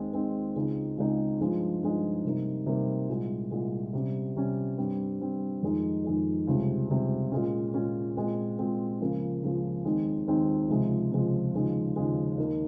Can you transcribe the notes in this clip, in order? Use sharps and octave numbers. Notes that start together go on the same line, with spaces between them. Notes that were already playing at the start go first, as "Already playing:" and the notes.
Already playing: D#2 D#3 G#3 C4
D#2 D#3 G#3 C4
C#2 C#3 G#3 C4 D#4
C#2 C#3 G#3 C4 D#4
G2 F3 G#3 D#4
G2 F3 G#3 D#4
C3 G3 A#3 D#4
C3 G3 A#3 D#4
C2 A#2 G#3
C2 A#2 G#3
C3 G3 C#4
C3 G3 C#4
G2 G3 C4
G2 G3 C4
F2 D#3 G#3 D#4
F2 D#3 G#3 D#4
C#2 C3 G3
C#2 C3 G3
A#2 G#3 C#4
A#2 G#3 C#4
A#2 G#3 C4
A#2 G#3 C4
C#2 C#3 F3 A#3
C#2 C#3 F3 A#3
D#2 D#3 G#3 C4 D#4
D#2 D#3 G#3 C4 D#4
C#2 C3 F3 G#3
C#2 C3 F3 G#3
D#2 C#3 F3 G#3
D#2 C#3 F3 G#3
D#2 D#3 A#3 D#4